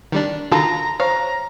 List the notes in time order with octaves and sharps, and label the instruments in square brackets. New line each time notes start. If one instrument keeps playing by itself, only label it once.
[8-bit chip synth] D#3 G3 D4
[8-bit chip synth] D3 D#3 F4 [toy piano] F#4 [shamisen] A4 [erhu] A#5
[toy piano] C5 [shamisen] C#5 [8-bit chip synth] F5 [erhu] A#5